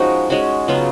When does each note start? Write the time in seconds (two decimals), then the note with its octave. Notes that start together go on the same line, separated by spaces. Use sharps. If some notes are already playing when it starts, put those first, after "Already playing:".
Already playing: F3 G#3 C#4 D#4 F#4
0.30 G#3 C#4 F#4
0.68 C#3 F#3 B3 F4